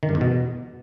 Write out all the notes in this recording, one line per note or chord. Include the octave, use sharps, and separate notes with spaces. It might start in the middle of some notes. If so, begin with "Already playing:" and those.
D#3
G2
E2
B2